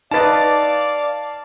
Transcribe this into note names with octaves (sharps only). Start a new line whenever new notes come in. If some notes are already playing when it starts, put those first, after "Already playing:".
D#4 B4 D5 D#5 F5 A5 D6 A6